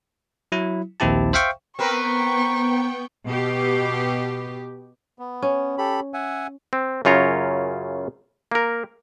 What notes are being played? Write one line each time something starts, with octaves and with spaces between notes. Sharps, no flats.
F#3 E4
A#1 D#2 C4 E4 G4 A5
C5 E5 F5 G5 C#6
B3 C4 A#4 B4 G5 C#6
B2 G4
B3
C#4
G4 A4 B5
E5 F#5 G#5
C4
F#2 C#3 F4 C#5 A#5
A#3 A#4